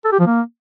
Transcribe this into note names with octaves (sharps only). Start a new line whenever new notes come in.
A4
G4
F3
A#3